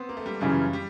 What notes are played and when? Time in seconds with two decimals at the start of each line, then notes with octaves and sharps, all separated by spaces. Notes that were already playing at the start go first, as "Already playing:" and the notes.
Already playing: B3 C4
0.09 A#3
0.17 A3
0.26 G3
0.41 F#2 C#3 E3 G3
0.73 G3